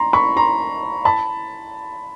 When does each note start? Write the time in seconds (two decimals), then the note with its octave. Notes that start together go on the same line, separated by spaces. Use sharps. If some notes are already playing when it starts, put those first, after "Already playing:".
Already playing: A#5 C6
0.13 B5 C#6
0.36 A#5 C6
1.05 A5 B5